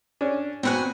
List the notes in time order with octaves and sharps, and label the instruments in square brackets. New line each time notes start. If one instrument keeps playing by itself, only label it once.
[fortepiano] C#4 D4
[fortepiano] A#2 B3 F#6 [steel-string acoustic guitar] C4 F#4 G#5